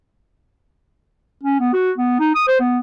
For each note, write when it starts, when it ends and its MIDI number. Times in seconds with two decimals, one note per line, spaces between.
1.44 1.59 61
1.60 1.70 59
1.74 1.91 66
1.98 2.16 59
2.20 2.31 63
2.35 2.46 87
2.48 2.58 72
2.60 2.78 59